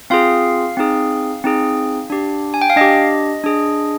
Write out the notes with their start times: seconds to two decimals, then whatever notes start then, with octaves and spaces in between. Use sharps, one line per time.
0.10 C4 F4 G#4 F5
0.77 C4 D#4 G#4
1.44 C4 D#4 G#4
2.10 D4 G4
2.54 G#5
2.61 G5
2.70 F5
2.76 D4 G4 D#5
3.44 D4 G#4